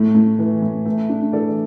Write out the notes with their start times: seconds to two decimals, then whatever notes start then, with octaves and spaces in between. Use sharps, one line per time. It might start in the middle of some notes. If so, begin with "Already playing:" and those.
Already playing: A2 A3
0.15 A2
0.39 E3
0.62 A2
0.85 A3
1.09 D4
1.33 E3 A4 D5